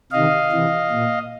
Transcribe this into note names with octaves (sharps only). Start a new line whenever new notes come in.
C3 D#3 D#5 F5
C3 E3
A#2